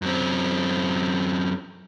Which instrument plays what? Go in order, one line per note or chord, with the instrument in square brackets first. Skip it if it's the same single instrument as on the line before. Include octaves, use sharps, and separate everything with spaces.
[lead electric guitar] F#2 C4